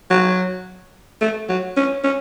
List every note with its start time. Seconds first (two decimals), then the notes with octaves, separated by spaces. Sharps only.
0.10 F#3
1.21 A3
1.49 F#3
1.77 C#4
2.03 C#4